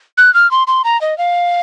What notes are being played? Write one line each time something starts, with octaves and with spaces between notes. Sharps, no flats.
F#6
F6
C6
C6
A#5
D#5
F5